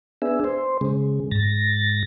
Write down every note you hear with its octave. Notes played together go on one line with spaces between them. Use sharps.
B3 D4 G#4 E5
C5
C#3 G#3
G#2 A6 A#6